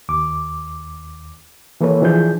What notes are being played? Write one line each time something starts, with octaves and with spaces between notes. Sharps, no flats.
D#2 D6
E3 A#3 A4 B4 C#5
E3 F3 D4 G#4 G6